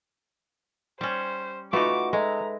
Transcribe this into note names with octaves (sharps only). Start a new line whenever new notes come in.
G3 C#4 C5
A3 D#4 F4 F#4 B4 F#5 C#6 D6
G#3 A4 B4 D#5 E5 A#5